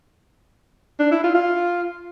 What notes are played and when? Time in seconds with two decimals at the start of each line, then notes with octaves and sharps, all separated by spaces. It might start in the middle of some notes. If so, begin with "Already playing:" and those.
0.99 D4
1.11 E4
1.24 F4
1.34 F4